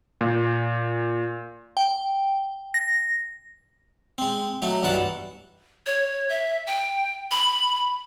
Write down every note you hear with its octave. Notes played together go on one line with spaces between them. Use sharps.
A#2
G5
A#6
G#3 C4
F#3 A3 D#4
B1 G2 E3 F#4 F#5 A5
C#5
E5
G5
B5